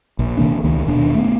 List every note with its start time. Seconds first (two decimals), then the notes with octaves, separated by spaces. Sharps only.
0.19 A#1
0.37 C3 D#3 A#3 D4
0.64 C#2 D#3
0.87 D#1 B2 D4
1.15 A3 B3